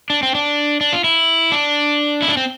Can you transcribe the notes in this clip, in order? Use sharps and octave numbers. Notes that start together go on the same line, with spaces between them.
D4
C4
D4
D4
F4
E4
D4
E4
D4
C4